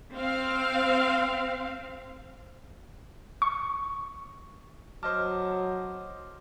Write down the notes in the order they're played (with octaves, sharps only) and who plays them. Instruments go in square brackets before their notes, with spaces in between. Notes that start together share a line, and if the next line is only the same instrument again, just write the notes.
[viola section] C4 F5
[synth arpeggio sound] C#6
[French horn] F#3 [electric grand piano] C5 D#5 A5 [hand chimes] D6 [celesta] F6